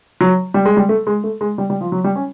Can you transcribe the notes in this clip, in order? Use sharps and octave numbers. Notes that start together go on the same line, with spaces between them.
F#3
G3
G#3
G3
A3
G#3
A3
G#3
G3
G3
F3
F#3
G3
C#4